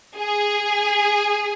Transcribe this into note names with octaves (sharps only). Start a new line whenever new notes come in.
G#4